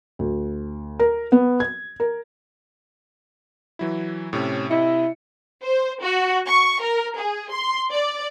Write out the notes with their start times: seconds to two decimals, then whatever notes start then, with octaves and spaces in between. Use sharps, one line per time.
0.19 D2
0.99 A#4
1.32 B3
1.60 G#6
2.00 A#4
3.79 E3 F#3 E4
4.33 A2 C3 C#4
4.71 C3 E4 D#5 C#7
5.63 C5
6.02 F#4
6.46 C#6
6.82 A#4
7.18 G#4
7.52 C6
7.90 D5